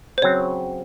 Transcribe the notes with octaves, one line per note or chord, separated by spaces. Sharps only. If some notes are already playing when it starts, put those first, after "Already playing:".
C5
C#3 F#3 C4 C#5